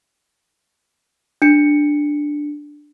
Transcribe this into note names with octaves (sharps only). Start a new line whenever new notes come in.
D4 C#7